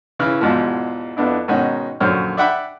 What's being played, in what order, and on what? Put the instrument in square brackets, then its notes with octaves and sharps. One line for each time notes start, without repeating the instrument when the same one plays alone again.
[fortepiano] C#3 E3 F6
E2 G#2 B2 F3
F2 B3 D4 E4
G#2 B2 D#3 C#4 D#4 F#4
A#1 F#2 D3 C5 C#5 F6
D5 E5 F#5 G5 B5 D6